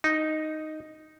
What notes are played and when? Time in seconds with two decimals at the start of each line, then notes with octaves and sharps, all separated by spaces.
0.04 D#4